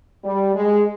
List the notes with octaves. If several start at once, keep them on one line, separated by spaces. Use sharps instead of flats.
G3
G#3